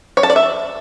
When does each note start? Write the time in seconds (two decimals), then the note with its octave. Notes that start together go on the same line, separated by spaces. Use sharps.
0.17 C#5
0.23 A5
0.30 D5
0.36 E5